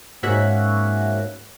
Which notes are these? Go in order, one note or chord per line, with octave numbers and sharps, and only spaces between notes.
G#2 A#3 C#4 F#4 E5 F#6